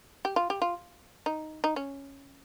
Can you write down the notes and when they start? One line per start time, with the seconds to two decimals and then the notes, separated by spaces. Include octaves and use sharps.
0.25 G4
0.36 F4
0.50 G4
0.62 F4
1.26 D#4
1.64 D#4
1.76 C#4